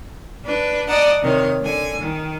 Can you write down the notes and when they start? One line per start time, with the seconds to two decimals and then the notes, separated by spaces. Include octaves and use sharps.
0.43 D4 B4
0.87 D5 D#5 F#5 A5 A#5
1.22 C3 D#3 C#5
1.61 D3 G#5
2.00 D#3